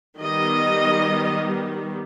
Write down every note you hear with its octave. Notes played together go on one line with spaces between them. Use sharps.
D#3 G3 B3 D#5